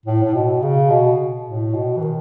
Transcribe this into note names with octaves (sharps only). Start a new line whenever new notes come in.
A2
A2
B2
C#3
B2
A2
B2
E3
D#3